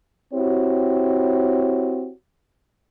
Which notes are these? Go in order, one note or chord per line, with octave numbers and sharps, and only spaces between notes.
C4 E4 F#4 G4 C#5